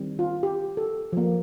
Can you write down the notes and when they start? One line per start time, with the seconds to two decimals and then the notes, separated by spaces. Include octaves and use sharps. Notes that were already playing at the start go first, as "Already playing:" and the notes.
Already playing: D#3 G3 C4
0.19 F4
0.43 G4
0.77 A4
1.13 F3 A#3